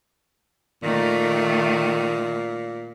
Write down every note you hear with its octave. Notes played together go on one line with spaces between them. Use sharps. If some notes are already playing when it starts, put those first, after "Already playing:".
A#2 D#3 A3